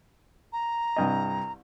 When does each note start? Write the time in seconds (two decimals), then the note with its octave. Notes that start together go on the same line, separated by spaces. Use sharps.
0.53 A#5
0.97 C2 G2 D#5